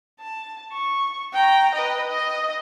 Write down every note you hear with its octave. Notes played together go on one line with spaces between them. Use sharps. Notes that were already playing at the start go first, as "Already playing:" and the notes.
A5
C#6
G5 A#5
B4 D#5
D#5